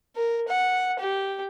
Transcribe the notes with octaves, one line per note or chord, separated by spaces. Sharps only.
A#4
F#5
G4